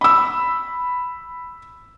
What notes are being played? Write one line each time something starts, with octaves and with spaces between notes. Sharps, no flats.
B5 E6